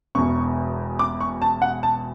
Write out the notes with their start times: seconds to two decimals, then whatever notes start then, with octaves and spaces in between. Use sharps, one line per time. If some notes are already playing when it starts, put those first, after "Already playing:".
0.15 E1 E2 B2 C#6
0.99 D6
1.20 C#6
1.42 A5
1.62 F#5
1.83 A5